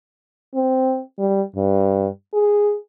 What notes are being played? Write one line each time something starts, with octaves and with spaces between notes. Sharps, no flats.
C4
G3
G2
G#4